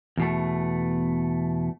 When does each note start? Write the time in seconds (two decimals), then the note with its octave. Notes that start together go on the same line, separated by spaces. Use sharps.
0.17 E2 B2 A3